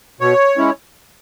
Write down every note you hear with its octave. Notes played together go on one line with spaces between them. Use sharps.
B2 C#5
G#3 C#4 E4